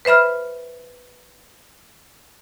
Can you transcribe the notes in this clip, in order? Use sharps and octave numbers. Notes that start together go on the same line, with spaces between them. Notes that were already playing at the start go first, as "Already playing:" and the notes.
B4 C5 E5 B5 F6